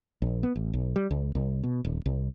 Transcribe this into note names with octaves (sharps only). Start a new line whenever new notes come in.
A#1
B3
A1
B1
G3
C#2
C2
B2
D#1
C2